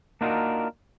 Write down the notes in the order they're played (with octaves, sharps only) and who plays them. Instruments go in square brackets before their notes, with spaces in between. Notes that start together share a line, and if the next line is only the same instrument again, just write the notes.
[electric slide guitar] A#3 D4 D#4 F4 F#4 A#4